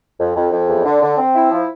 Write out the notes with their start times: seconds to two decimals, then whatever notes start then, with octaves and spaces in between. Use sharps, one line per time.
0.19 F2
0.36 F2
0.52 F2
0.68 E2
0.85 D3
1.02 D3
1.18 C4
1.35 E4
1.51 F3